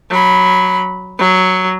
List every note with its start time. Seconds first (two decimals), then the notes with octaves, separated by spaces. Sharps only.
0.11 F#3 B5
1.19 F#3